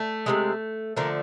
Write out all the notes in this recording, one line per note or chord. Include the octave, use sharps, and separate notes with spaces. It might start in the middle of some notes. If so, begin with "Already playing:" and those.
Already playing: A3
C3 E3 G#3
D3 F3 A3 A#3